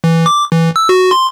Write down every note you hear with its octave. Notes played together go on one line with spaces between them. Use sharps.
E3
D6
E3
E6
F#4
C6